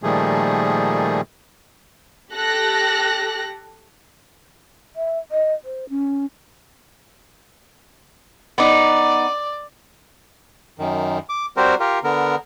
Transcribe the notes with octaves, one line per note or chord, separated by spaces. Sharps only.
A#2 D#3 F3 G3 A3 G#4
G4 A4 F#6 A#6
E5
D#5
C5
C#4
B3 D#4 D5
F#2 D#3
D6
G3 C4 F#4 G4 A#4 C5
F4 G4 A#4
D3 B3 A#4